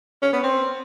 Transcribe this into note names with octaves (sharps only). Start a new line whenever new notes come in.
C#4
B3
C4